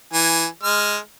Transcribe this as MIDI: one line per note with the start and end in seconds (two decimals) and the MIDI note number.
0.13 0.46 52
0.13 0.46 80
0.63 0.97 56
0.63 0.97 89